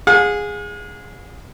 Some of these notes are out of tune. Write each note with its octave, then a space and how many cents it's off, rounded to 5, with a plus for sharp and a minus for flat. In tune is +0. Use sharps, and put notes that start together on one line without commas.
G#4 -10 F5 +45